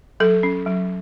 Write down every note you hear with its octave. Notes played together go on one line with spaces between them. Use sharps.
F#3 A4
C#4
F#3